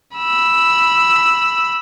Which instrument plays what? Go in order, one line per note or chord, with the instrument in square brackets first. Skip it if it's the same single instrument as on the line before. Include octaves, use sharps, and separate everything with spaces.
[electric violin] B5 E6